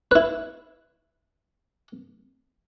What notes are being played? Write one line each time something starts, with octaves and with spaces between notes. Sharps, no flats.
E4 B4